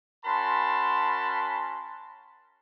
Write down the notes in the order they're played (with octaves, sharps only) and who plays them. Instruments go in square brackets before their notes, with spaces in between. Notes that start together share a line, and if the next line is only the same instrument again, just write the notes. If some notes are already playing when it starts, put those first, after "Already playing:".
[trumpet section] C#4 F#4 A#4 A5 B5 C6